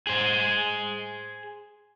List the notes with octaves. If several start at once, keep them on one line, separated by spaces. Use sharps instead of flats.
G#4 C5